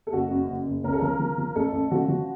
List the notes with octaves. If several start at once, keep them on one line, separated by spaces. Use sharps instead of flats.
A4
F#1 F#4
F#2
F#1
F#1
C#2 A#4
A4
F3 A#4
F3
F3
A1 A4
A1
F3 F#4
F3